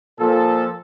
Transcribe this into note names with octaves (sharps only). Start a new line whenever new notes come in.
A#2 F3 A4